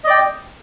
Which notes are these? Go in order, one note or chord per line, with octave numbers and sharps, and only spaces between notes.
D5 D#5 G5